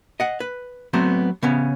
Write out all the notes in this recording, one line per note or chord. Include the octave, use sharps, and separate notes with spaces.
D#5 F#5
B4
F#3 A3 B3 C4
C#3 B3 C#4